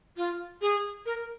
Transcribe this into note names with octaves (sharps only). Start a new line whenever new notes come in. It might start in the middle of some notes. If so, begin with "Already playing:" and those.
F4
G#4
A#4